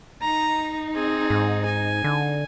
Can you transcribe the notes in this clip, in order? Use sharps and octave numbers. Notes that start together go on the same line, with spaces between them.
D#4 A#5
C4 G#4
G#2
G#5
D3